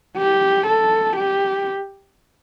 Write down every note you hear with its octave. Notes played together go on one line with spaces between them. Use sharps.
G4
A4
G4